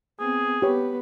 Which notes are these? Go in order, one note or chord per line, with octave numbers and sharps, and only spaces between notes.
B3 C4 G#4
B3 G4 B4 C#5